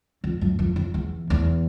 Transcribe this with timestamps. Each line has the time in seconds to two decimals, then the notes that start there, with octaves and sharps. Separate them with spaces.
0.24 F2
0.41 F#2
0.59 F2
0.76 F2
0.94 E2
1.30 E2